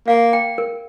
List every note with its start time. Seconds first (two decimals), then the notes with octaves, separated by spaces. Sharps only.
0.07 A#3 F5
0.33 G5
0.58 A#4